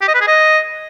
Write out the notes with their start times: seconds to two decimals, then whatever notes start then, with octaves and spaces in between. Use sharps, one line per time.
0.01 G4
0.08 D#5
0.14 B4
0.21 G#4
0.27 D#5